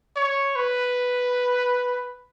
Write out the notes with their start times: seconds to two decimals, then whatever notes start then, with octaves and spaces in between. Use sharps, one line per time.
0.16 C#5
0.56 B4